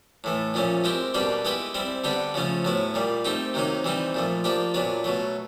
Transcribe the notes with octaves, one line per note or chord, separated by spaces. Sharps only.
A2 E3 A3
A#2 F3 A3 C#4
G#3 C4 E4 G4 A#4
B2 G3 A#3 D4 G4
G#3 B3 E4 G4 B4
G3 C4 E4
D3 G3 B3 D4 G4
C#3 F3 A3 C#4
A2 F#3 B3 E4
A#2 G3 A#3
A3 C4 D#4 G4
C3 D#3 F#3 A#3 D#4
E3 G3 C4 D#4
A#2 F3 A3
F3 A#3 D4 G4
A#2 F#3 B3 D4
B2 F#3 A3